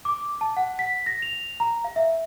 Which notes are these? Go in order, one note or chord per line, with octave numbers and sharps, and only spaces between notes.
D6
A5
F#5
B6
A#6
F7
A#5
F5
E5